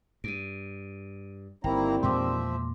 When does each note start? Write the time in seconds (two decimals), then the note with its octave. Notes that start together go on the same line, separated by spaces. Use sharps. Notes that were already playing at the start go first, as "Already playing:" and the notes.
0.24 G2 D7 D#7
1.64 G1 D#3 G3 A#3 C4 E4 G5 A#5
2.03 E2 A#2 F3 G#3 E5 C6 D6